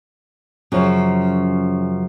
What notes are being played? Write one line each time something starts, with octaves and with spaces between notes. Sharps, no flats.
F#2 C#3 F3